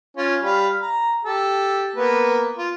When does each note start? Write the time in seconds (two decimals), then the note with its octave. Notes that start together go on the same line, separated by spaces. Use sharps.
0.17 C#4 F4
0.43 G3 F5 B5
0.82 A#5
1.25 G4 A4
1.96 A#3 B3 B4
2.58 F4